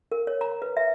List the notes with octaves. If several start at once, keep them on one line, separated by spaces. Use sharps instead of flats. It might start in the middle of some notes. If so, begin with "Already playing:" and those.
A#4
C#5
A#5
B4
E5